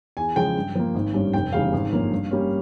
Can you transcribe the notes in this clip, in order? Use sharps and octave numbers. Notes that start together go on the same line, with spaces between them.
E2 G#5
C#3 F3 G#3 G5
G2
F3 A#3
G#1
G2 G3 C#4
F1 G5
E2 C#3 E3 G3 F5
G#1
G2 F3 A#3 C#4
G2
G3 A#3 C#4